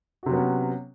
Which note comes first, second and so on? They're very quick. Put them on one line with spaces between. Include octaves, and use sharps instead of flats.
F#4 C3 F#3 B3 C#4